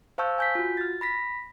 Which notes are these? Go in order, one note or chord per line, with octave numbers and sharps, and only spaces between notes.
C5 F5 A5 C#6 E6 G6
G#5 G6 B6
F4 F#4
F6 A6
B5 A#6 B6